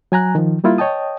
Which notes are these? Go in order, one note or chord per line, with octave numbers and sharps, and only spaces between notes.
F#3 G#5 A#5 F#6
D#3 F3
G3 A#3 E4 F4
C#5 D#5 G5 A5 D#6